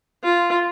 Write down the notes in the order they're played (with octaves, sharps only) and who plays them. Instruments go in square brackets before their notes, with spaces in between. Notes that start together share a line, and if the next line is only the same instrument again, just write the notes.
[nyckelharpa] F4